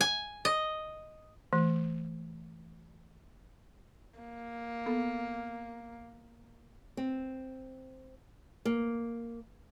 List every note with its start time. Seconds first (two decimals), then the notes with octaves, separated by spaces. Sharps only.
0.01 G#5
0.45 D#5
1.53 E3 A3
4.19 A#3
4.86 B3 A4
6.97 C4
8.65 A#3